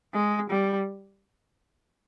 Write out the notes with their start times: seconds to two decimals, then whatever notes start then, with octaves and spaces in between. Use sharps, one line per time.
0.13 G#3
0.50 G3